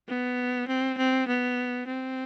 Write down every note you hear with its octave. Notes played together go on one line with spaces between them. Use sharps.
B3
C4
C4
B3
C4